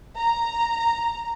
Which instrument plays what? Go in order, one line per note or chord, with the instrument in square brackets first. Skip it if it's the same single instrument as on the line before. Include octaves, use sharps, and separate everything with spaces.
[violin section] A#5